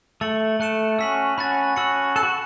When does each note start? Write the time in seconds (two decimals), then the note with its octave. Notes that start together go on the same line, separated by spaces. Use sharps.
0.21 A3 E6 A6 C#7 F#7
0.60 A3 A5 F#6 C#7 E7
0.98 C#4 F#4 E6 B6 F#7
1.38 C#4 F#4 B5 F#6 A6
1.76 C#4 F#4 E6 C#7 F#7
2.16 A4 F#6 C#7 E7
2.23 F#4